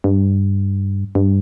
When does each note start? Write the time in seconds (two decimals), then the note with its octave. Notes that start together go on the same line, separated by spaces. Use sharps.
0.04 G2
1.15 G2